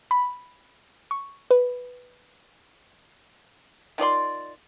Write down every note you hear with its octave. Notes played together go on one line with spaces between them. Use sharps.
B5
C#6
B4
D#3 F4 D5 C6